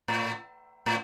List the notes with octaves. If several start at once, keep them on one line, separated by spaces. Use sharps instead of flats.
A2
A2